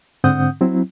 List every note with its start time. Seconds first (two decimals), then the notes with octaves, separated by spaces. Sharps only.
0.24 G#2 D3 C4 F#5 D#6 G6
0.61 F#3 C4 E4